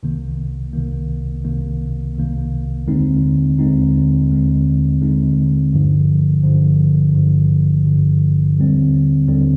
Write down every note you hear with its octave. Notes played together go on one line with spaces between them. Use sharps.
C2 C3 D#3 A#3
C2 C3 D#3 A#3
C2 C3 D#3 A#3
C2 C3 D#3 A#3
D#2 D3 G#3 C4 D#4
D#2 D3 G#3 C4 D#4
D#2 D3 G#3 C4 D#4
D#2 D3 G#3 C4 D#4
G#1 G2 D3 F3
G#1 G2 D3 F3
G#1 G2 D3 F3
G#1 G2 D3 F3
D#2 D3 G3 C4
D#2 D3 G3 C4